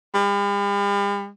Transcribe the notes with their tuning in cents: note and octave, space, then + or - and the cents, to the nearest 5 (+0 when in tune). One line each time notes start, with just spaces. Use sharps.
G3 +45